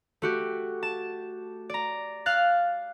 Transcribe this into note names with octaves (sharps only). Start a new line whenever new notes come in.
A3 F#4 G4
A5 E7
D5 A#5
F5 F6 F#6 A6